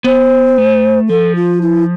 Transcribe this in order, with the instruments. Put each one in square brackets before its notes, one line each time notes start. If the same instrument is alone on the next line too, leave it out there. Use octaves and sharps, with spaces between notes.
[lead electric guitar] B3 [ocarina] C5
[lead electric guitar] A3
[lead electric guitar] F3 [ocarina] A4
[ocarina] F4
E4